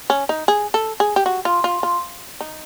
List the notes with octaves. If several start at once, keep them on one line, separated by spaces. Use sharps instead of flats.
C#4
D#4
G#4
A4
G#4
G4
F#4
F4
F4
F4
D#4